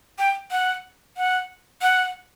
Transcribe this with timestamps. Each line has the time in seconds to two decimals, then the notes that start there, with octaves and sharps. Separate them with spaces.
0.18 G5
0.51 F#5
1.17 F#5
1.82 F#5